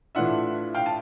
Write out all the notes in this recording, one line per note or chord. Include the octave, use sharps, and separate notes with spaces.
A2 E3 A3 D4 F4 E5 F#5
F5 G5
A5